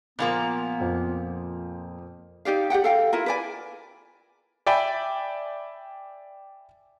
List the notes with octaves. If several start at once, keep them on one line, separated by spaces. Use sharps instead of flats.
A#2 F3 A#3 B3
F2 C5
D#4 G4 D5 F5
G4 D5 F#5 G5
A4 F5 G5
E4 F4 A#4
B4 D5 G#5
D5 E5 G5 G#5 B5